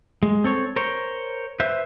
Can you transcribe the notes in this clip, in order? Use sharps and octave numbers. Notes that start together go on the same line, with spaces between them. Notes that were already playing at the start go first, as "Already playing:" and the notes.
G#3
C4 A4 C#5
A#4 C5 C#5
B4 C5 E5